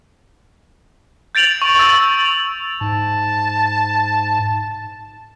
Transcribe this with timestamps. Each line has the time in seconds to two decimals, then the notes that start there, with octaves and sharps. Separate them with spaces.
1.35 G6 A6 D7 F7 F#7
1.62 C#6
1.79 E6 A6
2.81 G#2 A5